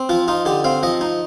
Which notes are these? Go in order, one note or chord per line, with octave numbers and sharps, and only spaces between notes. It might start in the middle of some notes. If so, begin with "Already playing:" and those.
Already playing: C4
F3 F4
D#4 F4
D3 G4
C4 F5
F3 D#5
D#4